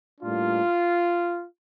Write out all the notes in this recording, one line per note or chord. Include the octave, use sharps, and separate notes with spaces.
A2 G3 A#3 D4 F4